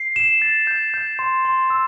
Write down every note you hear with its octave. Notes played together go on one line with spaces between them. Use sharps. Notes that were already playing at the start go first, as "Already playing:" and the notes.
Already playing: C7
E7
A6
G6
G6
C6
C6
E6